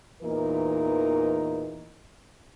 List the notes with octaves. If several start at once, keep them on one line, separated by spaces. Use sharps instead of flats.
E2 A#2 E3 D#4 A#4